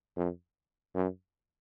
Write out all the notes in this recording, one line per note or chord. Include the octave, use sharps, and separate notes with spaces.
F2
F#2